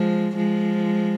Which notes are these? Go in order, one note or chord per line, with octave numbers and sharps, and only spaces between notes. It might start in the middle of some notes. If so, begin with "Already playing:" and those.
Already playing: F3 G#3
F3 G#3